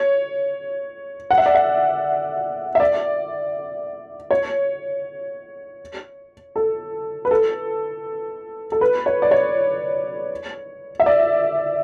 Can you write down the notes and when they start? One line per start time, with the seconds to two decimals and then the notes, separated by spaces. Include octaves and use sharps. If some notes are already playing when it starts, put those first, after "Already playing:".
Already playing: C#5
1.31 F#5
1.38 E5
1.46 D5
1.55 E5
2.75 E5
2.80 D5
4.31 C#5
6.56 A4
7.25 B4
7.31 A4
8.72 A4
8.81 B4
9.06 C#5
9.22 D5
9.31 C#5
11.00 E5
11.06 D5